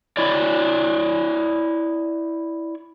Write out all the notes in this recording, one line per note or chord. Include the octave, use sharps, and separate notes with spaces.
E4 C#5 D5